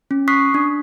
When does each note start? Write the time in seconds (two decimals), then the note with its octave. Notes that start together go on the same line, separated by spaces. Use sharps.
0.11 C#4
0.28 C#6 D#6 F#6 B6 C7
0.54 D4